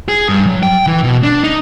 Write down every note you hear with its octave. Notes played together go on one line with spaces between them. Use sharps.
G#4
G2
F#3
G5
E3
B2
D4
D#4